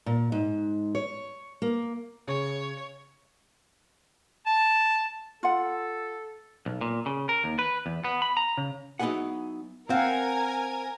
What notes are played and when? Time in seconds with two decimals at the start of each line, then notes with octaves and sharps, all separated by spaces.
0.06 A#2
0.32 G#2
0.95 C#5
1.62 A#3
2.28 C#3 C#5
4.46 A5
5.43 F4 A4 F#5
6.66 B1
6.81 A#2
7.06 C#3
7.29 A#4
7.44 D#2
7.59 B4
7.86 E2
8.04 B3
8.22 B5
8.37 A#5
8.58 C#3
8.99 F#3 B3 D#4 E4 G#4 F#5
9.90 C4 A#4 F5 F#5 G#5